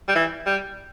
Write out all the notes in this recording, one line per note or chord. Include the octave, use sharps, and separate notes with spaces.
G3
E3
G3